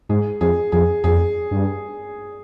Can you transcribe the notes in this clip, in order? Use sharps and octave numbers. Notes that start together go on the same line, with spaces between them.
G#2 G#4
F2 G#4
F2 G#4
F2 G#4
G2